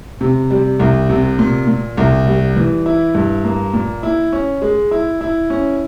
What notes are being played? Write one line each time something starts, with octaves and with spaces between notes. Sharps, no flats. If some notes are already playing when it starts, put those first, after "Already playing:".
C3
G3
C2
C3
A#2
A#2
C2
G3
E3
E4
G2
A#3
A#2
E4
C#4
G#3
E4
E4
C#4